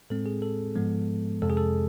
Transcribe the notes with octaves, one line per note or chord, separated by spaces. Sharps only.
A2 G#3 C4 A4
G#4
A4
G#2 F3 G#3 B3
F2 C3 G#3 A4
G#4
A4